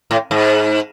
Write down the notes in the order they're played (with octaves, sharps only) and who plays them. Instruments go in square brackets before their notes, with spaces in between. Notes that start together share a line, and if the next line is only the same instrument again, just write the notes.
[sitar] A2
G#2